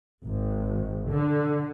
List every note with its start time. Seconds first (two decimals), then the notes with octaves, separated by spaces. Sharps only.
0.24 G#1
1.09 D3